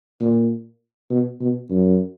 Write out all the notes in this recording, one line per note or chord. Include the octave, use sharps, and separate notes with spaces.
A#2
B2
B2
F#2